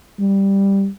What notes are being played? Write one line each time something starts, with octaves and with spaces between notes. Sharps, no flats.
G3